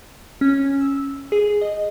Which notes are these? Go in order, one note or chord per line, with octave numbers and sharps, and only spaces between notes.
C#4
E6
G#4
D#5